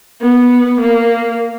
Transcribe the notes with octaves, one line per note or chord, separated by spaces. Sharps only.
B3
A#3